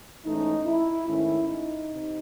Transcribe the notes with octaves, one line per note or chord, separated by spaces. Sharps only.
G#2 E3 A3 C#4 D#4
E4
G#2 D#3 A3 C#4 E4
D#4
C3